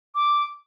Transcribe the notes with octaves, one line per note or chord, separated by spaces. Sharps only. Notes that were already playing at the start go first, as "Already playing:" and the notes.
D6